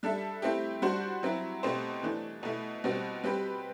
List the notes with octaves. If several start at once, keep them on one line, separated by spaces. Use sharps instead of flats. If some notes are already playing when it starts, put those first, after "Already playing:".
G3 D4 A4 E5
A3 C4 E4 G4
G3 D4 F#4 C5
F#3 C4 E4
B2 A3 C4 G4 C5
E3 A3 D4
B2 A3 E4
B2 G3 C4 F#4
G3 C4 G4 B4